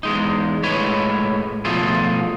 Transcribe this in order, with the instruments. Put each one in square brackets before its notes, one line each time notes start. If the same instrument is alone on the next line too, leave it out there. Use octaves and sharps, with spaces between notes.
[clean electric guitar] E2 G#3 D#4
A2 G#3 B4 C#5
B2 F3 A3 F4 G#4